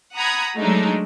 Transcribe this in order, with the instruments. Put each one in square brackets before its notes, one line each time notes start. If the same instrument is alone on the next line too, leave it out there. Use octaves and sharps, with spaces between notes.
[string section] F#5 A#5 B5 D#6 G#6
F#3 G#3 A3 D4 D#4